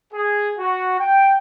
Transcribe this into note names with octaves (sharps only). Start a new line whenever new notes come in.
G#4
F#4
G5